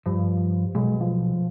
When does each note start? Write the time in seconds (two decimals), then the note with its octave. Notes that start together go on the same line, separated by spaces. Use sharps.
0.06 G2 F3
0.75 B1 G#3
1.01 F3